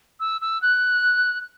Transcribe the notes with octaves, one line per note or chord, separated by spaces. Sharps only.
E6
E6
F#6